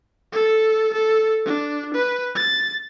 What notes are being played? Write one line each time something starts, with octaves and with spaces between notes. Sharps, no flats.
A4
A4
D4
B4
A6